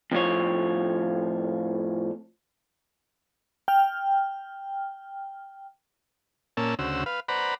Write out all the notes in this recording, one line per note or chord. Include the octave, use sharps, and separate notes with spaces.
F2 A2 F3 C#5
G5 F6
A#2 A#3 C#4 A5 E6
D2 C#3 F#4 C5 E6
B4 F5
B4 C5 D5 F#5 A#5 B5